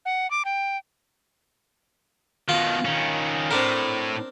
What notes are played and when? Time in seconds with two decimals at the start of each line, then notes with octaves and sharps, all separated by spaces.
0.05 F#5
0.31 D6
0.45 G5
2.49 B2 D#3 F4
2.85 D#3 C#4
3.51 A2 C4 D4 A#4